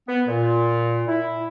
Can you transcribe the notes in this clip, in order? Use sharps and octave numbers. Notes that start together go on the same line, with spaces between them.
B3
A#2
E4